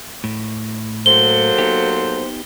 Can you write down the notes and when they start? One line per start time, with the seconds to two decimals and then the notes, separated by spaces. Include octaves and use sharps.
0.24 A2
1.06 F#3 A#3 A4 C5 G7
1.58 B3 D#4 G4